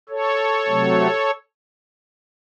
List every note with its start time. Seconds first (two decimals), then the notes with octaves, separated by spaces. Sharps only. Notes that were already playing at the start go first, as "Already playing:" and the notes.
0.09 A4 C#5
0.67 C3 F#3 A3